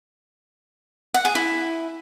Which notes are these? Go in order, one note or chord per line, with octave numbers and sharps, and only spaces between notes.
F#5
G#4
E4